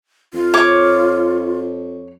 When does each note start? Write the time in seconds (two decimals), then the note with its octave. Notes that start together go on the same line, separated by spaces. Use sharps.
0.34 F2 F4
0.54 C#5 D6